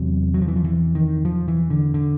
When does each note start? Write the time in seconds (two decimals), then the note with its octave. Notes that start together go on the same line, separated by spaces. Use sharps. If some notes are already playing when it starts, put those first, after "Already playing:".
Already playing: E2 C3 F#3
0.34 F#3
0.42 F3
0.48 E3
0.56 F3
0.64 E3
0.95 D#3
1.25 F3
1.48 E3
1.70 D3
1.94 D3